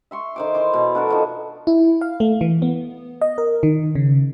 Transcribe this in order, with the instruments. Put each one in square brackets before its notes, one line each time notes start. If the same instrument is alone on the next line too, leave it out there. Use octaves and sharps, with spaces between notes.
[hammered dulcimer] E5 C6 C#6
D#3 C5 D6
E3 C6 D6
B2
A3 D4 F#4 A#4
D#3 F3 B3
[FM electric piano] E4
F5
A3
E3
B3
D#5
A#4
D#3
C#3